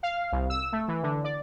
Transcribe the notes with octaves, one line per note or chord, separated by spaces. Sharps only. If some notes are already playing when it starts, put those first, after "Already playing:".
F5
C2
E6
A3
E3
D3
D5